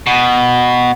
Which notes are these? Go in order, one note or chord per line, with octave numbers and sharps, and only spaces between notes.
B2